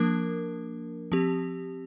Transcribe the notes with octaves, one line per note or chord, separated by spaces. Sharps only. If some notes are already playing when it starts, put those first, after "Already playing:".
Already playing: F3 A#3 D4 A#4
F3 C4 G4